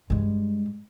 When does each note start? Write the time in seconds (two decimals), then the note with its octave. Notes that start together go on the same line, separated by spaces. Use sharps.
0.10 G2 G#3